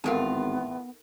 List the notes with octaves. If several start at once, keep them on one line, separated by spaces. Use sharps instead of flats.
G#1 E2 A2 B3 D#4 F4 A4 A#4